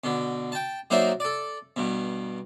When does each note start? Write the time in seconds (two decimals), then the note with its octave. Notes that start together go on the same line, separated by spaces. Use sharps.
0.04 B2 D3
0.52 G5 A5
0.90 F#3 A#3 D#4 C5 D5 E5
1.20 A4 D5
1.76 G2 B2